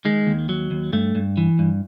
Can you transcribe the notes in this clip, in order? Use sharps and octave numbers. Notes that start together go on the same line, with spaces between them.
D#3 G#3
D#2
F#3
D#2
G2 A3
G2
E3
G2